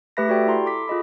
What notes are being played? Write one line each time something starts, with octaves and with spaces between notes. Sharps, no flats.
A3 G4 B4 E5 B5 A#6
F#4 G4 A4 D5 G5
E4 A#5 C6
A4 D6 B6
F4 G#4 D#5 B5